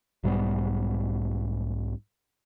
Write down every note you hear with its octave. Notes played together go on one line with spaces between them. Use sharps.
B1 G#2 G3 B3